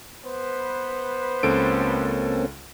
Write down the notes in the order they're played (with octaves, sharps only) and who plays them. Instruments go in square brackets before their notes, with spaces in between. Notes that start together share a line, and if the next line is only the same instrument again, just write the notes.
[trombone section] B3 B4 C5
[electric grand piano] C#2 A4 D7 [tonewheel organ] A#3 C4 C#4